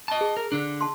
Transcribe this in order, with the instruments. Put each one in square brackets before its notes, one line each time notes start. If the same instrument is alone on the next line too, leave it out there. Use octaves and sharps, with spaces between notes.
[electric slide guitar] D#5 A5
[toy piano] G#4
[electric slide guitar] A#4
D3 D4
[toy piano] A5 C6